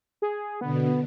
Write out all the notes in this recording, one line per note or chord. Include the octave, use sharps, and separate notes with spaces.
G#4
B2 D3 B3